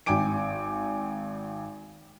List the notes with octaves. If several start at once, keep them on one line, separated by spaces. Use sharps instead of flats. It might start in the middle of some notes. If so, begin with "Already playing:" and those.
G#1 G5 G#5 D6 D7